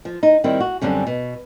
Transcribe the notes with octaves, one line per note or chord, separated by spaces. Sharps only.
F3
D#4
D#3 G3 C4 E4
F#4
F#2 D3 G3 C4 C#4
B2